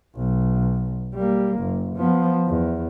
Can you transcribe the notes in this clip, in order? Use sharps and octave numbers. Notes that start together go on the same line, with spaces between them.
B1
G3 A#3
F#1
F3 B3
E2